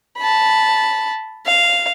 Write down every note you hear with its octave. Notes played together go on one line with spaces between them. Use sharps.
A5 B5
F5